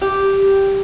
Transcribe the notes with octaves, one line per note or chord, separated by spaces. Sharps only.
G4